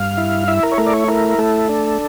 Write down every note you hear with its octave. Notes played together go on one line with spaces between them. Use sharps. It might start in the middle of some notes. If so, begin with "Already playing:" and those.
Already playing: G2 F5
E4
E4 E5
A#4
C#5
A3 A#4
D5
C#5
E4 A#4
A3 A4
D4